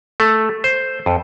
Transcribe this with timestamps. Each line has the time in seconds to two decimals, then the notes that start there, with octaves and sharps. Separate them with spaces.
0.20 A3
0.64 C5
1.06 F2